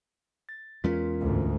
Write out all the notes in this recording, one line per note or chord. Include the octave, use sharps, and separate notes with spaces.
A6
E2 G#3 C#4 F4 A#4
D2 G#2